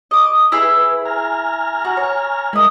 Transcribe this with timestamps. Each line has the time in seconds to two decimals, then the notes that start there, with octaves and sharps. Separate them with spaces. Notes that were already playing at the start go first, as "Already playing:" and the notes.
0.11 D#5 D6
0.52 E4 G#4 B4 B5
1.05 G#5 A#5 F6
1.85 F#4
1.97 C#5
2.53 G#3 E4 A#4 D#5